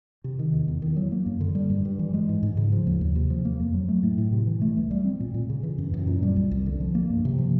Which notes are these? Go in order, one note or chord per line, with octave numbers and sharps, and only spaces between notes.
C3
D#3
E2
E2
D#3
F#3
A#3
F#2
D3
G3
G2
G2
E3
G#3
G#2
G#2
C#3
F3
D#2
D#2
C3
F3
A#3
F2
F#3
A3
A2
A2
C3
E3
A3
C2
G3
C4
A#2
A#2
C#3
E3
F#2
F#2
A#2
G3
C2
C2
D3
F3
A#3
G2
C3
F3